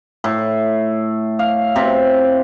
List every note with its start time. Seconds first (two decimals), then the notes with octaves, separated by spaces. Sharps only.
0.24 A2
1.39 F5
1.76 C3